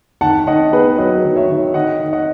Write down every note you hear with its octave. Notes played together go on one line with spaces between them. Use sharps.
D#3 F#5 A5
D#3 D#5 F#5
B3 G#4 B4
F#3 B4 D#5
D#3
C#5 E5
D#3
D#3 D#5 F#5
D#3
D#5 F#5